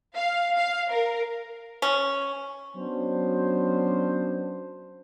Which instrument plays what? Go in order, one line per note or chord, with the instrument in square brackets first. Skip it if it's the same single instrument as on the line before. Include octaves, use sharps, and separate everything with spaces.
[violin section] F5
F5
A#4
[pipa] C#4
[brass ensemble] F#3 B3 C#4 D4 C5